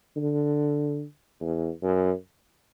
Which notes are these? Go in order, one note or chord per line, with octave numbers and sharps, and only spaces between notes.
D3
E2
F#2